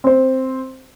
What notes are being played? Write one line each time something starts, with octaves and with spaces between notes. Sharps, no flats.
C4 C5